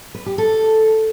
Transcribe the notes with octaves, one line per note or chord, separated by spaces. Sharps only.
B4
G4
A4